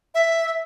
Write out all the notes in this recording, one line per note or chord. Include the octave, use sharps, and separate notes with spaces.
E5